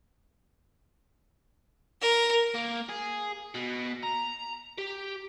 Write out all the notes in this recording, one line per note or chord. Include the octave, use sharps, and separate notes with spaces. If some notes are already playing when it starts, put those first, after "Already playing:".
A#4
A#3
G#4
B2
A#5
G4